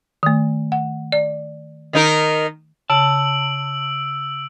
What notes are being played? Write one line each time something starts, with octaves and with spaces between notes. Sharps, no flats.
D#3 A3
F#5
D5
D#3 D#4 A#4
C#3 A5 E6 D7 F#7